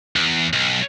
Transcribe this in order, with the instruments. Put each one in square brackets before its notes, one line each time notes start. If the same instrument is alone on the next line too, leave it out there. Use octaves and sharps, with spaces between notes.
[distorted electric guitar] E2
B1